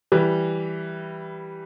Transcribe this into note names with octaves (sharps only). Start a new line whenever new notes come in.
E3 G3